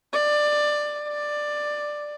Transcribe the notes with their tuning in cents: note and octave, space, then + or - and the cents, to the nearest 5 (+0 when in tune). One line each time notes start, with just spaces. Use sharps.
D5 +15
D5 +10